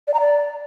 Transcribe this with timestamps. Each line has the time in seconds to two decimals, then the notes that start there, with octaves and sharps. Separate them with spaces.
0.07 D5
0.14 A#5
0.20 D5